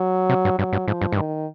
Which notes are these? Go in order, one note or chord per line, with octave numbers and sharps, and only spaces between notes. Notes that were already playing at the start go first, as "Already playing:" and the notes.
Already playing: F#3
C3
G2
G2 F#3
G2
G#2 F3
G2
G#2
G2 D#3